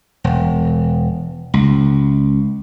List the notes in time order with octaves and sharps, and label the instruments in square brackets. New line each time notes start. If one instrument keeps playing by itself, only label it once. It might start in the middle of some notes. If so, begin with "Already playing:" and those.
[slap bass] E1
C#2